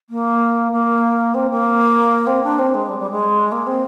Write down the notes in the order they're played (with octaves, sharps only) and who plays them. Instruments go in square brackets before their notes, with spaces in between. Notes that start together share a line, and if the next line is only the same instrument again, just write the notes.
[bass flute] A#3
A#3
C4
A#3
C4
D4
C4
G#3
G3
G3
G#3
A#3
C4